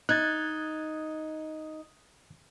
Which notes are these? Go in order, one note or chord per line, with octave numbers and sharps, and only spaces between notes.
D#4 F#6 G#6 A6